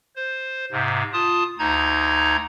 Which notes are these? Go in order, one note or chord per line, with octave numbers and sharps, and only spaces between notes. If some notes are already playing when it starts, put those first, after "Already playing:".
C5
G#2 C3
F4 A5 D#6
D2 D#4 A#5 G#6